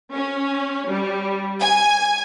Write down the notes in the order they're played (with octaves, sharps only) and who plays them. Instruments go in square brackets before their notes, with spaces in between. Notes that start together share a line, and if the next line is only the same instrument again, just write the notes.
[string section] C#4
G3
G#5